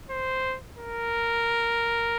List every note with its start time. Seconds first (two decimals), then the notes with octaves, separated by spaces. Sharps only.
0.10 C5
0.78 A#4